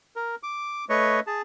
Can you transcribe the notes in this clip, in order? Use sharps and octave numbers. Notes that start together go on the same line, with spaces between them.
A#4
D6
A3 B4 C#5 D#5 C#6
G#4 A5